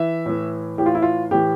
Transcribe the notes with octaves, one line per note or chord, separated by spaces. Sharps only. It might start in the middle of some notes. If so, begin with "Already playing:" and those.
Already playing: E3 E5
A2 E3
A2 E3 G4
F4
E4
F4
A2 E3 G4